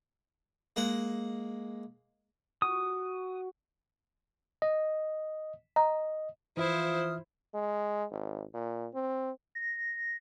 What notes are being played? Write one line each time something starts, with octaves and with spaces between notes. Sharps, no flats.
G#3 A#3 F#5
F#4 D#6
D#5
D#5 A#5
E3 F3 E4 F4 C5 E5 D#6 F6
G#3
G#1
A#2
C4
A#6